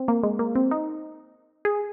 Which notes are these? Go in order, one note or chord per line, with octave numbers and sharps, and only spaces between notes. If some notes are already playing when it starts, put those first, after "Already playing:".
Already playing: C4
A#3
G#3
A#3
C4
D#4
G#4